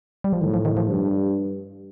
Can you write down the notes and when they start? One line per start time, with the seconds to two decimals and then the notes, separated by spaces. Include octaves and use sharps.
0.24 G3
0.33 F3
0.41 A2 D#3
0.54 F3
0.65 D#3
0.77 F3
0.89 G2